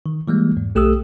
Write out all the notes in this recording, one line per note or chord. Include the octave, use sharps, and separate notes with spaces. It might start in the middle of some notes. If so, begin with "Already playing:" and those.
D#3
E3 G3 G#3 A#3
E2 G#2
B1 A3 G4 A4 D#6 E6